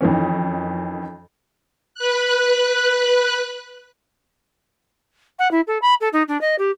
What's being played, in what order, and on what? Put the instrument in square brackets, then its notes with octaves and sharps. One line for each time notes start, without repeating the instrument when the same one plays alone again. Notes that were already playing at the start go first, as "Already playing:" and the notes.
[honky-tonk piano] F2 D#3 E3 C#4
[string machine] B4 F#6
[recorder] F#5
E4
A4
B5
A4
D#4
D4
D#5
G4